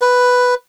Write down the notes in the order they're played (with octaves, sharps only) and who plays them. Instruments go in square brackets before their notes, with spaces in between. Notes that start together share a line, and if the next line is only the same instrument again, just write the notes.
[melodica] B4